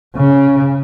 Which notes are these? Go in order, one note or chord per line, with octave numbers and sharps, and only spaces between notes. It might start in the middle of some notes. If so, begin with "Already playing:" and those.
C#3